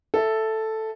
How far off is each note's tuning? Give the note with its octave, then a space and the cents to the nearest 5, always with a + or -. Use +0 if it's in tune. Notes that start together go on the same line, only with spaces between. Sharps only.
A4 +0 E5 +0